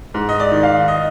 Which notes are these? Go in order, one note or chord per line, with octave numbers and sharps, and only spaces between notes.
G#2
D#5
D5
D#3
F5
D#5